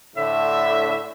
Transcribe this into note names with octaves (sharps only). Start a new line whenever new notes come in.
A2 D3 E5